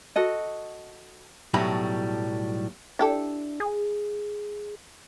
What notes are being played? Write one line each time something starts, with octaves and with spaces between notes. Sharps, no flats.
F#4 A4 D#5
B1 A2 F#3 G3 B5
D4 E4 G4 A4
G#4